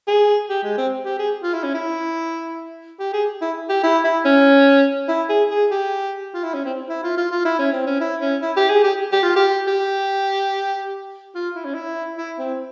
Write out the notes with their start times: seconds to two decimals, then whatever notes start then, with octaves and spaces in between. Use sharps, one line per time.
0.07 G#4
0.49 G4
0.63 G#3
0.77 C4
1.05 G4
1.19 G#4
1.43 F4
1.53 E4
1.64 C#4
1.74 E4
2.99 G4
3.13 G#4
3.41 E4
3.69 G4
3.83 E4
4.04 E4
4.25 C#4
5.08 E4
5.29 G#4
5.50 G#4
5.71 G4
6.34 F4
6.43 E4
6.54 C#4
6.65 C4
6.89 E4
7.03 F4
7.17 F4
7.31 F4
7.45 E4
7.59 C#4
7.72 C4
7.86 C#4
8.00 E4
8.21 C#4
8.42 E4
8.56 G4
8.70 G#4
8.84 G4
9.12 G4
9.23 F4
9.36 G4
9.67 G4
11.34 F4
11.55 E4
11.65 C#4
11.74 E4
12.17 E4
12.39 C4